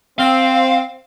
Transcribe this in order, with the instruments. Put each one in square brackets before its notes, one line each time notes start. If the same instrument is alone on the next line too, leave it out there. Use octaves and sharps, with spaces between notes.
[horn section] C4 [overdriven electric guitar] F5